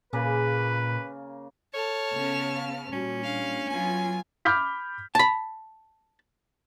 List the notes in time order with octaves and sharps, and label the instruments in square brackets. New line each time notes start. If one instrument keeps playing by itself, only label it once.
[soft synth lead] A#2 [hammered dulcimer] C#3 A#3 G#5 [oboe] B4
[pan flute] A4 [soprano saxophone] C#5 [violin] A5 F6
[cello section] C#3 B3 C#4
[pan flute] F5
[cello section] A#2 G3 [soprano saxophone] C#4 [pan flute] F#4
[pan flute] D4 [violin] F5
[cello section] F#3 B3 F4 [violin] G#5
[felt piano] B5 D6 F6 G6 B6
[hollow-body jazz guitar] A5 B5